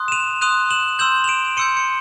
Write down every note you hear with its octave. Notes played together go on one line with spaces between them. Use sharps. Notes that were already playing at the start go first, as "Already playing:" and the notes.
Already playing: C6 D#6 F#6
E7
D#7 F7
C6 D#6 F#6 D#7 F7
E7 F#7
C6 E6 G6 E7 F#7
F7
D7 E7
C6 E6 G6 C#7 D#7
C#7